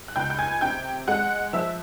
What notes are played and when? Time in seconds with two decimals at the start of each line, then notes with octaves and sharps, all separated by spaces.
0.08 F#6
0.16 C#2 G5 G6
0.30 G6
0.39 G#5 G#6
0.61 C3 G5 G6
1.08 G#3 F#5 F#6
1.53 F3 E5 E6